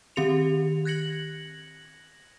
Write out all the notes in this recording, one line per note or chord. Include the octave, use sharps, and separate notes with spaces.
D#3 C4 G4 C#7 F7
F#6 G#6 A#6 C#7 F#7